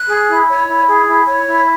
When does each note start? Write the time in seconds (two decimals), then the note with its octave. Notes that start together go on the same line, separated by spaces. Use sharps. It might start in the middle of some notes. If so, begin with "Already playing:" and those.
Already playing: F#6
0.08 G#4
0.29 E4
0.48 C#5
0.68 E4
0.88 G#4
1.07 E4
1.27 C#5
1.46 E4